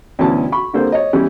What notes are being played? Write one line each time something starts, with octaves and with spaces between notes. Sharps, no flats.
D2 B2 E3 C#4 A5
B5 C#6
D3 G3 A#3 C4 A4 C5
C#5 D#5
E3 G3 B3 C#4 E4